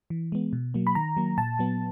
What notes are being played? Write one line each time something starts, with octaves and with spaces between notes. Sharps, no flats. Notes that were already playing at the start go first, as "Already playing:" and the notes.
E3
G#3 B3
B2
F#3 A#3
B5
D#3 A#5
F#3 A#3
A#2 A5
F#3 B3